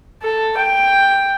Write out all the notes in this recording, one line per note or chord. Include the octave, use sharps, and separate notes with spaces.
A4
G5